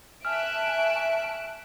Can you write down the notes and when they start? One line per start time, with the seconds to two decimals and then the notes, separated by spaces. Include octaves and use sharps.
0.25 E5 G#5 A5 C#6 F6 F#6 D7